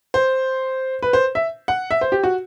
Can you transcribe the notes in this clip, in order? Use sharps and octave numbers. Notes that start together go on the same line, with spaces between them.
C5
B4
C5
E5
F#5
E5
C5
G4
F#4